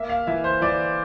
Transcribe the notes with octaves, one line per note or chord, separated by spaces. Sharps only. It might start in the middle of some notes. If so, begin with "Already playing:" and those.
Already playing: A#3 E5
F5
E3 E5
C5
E3 D5